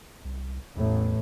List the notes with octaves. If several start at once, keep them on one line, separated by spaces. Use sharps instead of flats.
C2
A1 E2 A2